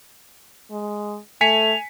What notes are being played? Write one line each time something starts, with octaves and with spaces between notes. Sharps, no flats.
G#3
A3 G#5 B6 C#7 F7